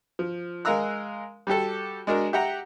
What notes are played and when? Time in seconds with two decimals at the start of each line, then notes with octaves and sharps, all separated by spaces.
0.19 F3
0.65 G#3 A#4 F5 A#5 E6 F#6
1.47 G3 F#4 G4 A4
2.07 G#3 D4 F#4 A#4
2.33 G4 E5 F#5 G5 A#5